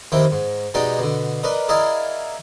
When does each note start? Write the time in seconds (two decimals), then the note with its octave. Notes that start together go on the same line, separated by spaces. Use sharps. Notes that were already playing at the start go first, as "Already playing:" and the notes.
0.12 D#2 C3 D#3 E4 G5
0.31 G#2
0.74 B2 G#3 D#4 G4 D5 G5
0.99 B2 D3
1.43 D4 A#4 B4 D#5
1.68 E4 G#4 A#4 D5 D#5 F5